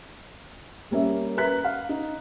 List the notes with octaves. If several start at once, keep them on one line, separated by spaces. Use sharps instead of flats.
G3 A#3 C#4 E5
B4 E5 A#5 F#6 B6
F5
D#4